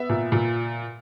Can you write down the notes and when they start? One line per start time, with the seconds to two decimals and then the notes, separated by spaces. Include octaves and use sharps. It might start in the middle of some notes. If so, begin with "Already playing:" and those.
Already playing: B3 E5
0.09 A#2
0.32 A#2